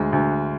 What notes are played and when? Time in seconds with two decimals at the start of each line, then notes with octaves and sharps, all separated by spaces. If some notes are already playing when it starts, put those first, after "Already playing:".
Already playing: D2 G#3
0.13 D2